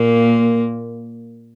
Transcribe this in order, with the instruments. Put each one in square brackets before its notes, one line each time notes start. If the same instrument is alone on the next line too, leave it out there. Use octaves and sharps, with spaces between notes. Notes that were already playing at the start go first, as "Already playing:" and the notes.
Already playing: [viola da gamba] A#2 A#3